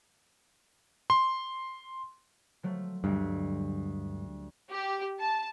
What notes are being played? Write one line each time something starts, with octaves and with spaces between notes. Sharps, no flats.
C6
F3 F#3 A3
D2 G2 G3 G#3
G4
A5